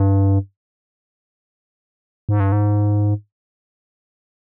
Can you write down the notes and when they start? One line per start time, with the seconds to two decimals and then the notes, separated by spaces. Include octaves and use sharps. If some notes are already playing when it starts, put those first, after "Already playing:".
Already playing: G2
2.29 G#2
2.40 G2
2.52 G#2